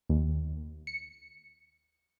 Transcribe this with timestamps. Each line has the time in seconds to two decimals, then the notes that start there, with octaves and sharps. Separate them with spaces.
0.10 D#2
0.87 C#7